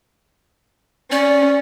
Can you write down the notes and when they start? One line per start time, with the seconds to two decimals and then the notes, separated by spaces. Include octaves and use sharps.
1.12 C#4 D5